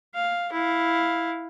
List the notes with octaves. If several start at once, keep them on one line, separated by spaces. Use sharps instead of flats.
F5
E4 F5